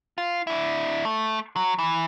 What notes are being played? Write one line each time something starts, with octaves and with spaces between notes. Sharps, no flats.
F4
D4 E4
A3
F#3
E3